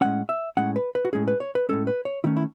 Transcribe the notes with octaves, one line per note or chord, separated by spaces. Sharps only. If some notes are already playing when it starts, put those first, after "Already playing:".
A2 G#3 C#4 F#5
E5
A2 G#3 C#4 F#5
B4
B4
F#4
A2 G#3 C#4 G#4
B4
C#5
B4
A2 G#3 C#4 A4
B4
C#5
D#3 A3 C#4 E4
E4